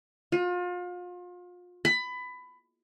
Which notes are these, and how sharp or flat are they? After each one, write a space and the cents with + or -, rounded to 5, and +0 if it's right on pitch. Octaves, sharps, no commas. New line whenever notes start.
F4 +35
B5 +20